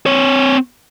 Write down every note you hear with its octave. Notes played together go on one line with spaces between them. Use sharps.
C4 C#5